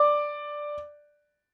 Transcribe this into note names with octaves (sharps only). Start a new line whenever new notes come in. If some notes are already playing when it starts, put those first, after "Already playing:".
Already playing: D5 D6